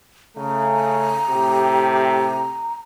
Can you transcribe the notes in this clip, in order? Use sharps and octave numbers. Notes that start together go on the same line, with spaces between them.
C#3 A3 A#5
A2 C3 G4